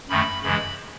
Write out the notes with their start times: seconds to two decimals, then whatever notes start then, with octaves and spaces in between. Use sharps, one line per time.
0.09 F#2 D#3 A3 B5
0.43 F#2 C#3 E3 G#3 B5